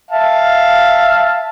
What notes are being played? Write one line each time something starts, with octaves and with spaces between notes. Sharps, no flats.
E5 F5 A5